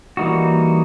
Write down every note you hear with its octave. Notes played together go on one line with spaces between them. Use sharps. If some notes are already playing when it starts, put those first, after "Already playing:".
E3 G3 A#3 D#4 F#4